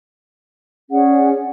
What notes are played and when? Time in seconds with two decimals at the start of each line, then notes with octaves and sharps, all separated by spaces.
0.91 C#4 G#4 D5 F#5